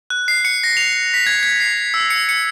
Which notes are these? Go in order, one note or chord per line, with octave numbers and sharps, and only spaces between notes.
F#6
C7
C#7
A#6
F7
B6
G#6
G#6
C7
E6
C#7
C#7